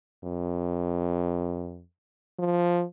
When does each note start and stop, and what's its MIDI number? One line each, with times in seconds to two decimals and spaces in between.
0.24 1.82 41
2.39 2.83 53